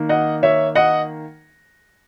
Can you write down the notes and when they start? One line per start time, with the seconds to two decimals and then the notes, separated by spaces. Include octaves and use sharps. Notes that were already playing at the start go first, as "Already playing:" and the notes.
Already playing: D#3 A#3
0.09 D#5 F#5
0.43 C#5 E5
0.75 D#5 F#5